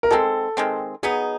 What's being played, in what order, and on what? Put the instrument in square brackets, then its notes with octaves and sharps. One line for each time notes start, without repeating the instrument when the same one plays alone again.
[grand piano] A#4
[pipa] D#3 G#3 C4 [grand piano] A4
[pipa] D#3 G#3 C4
[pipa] F#3 B3 D#4 [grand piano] G#4